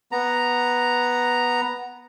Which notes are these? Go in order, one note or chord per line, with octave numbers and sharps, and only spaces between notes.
B3 A#5